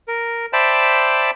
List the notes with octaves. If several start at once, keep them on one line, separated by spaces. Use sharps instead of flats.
A#4
C5 D5 E5 G5 A5 B5